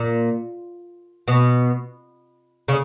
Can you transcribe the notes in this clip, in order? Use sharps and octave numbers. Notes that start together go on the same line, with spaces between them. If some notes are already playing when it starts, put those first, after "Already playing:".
Already playing: A#2
B2
C#3